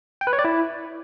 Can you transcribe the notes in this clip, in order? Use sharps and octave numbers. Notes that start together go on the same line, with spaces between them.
G5
B4
C#5
D5
E4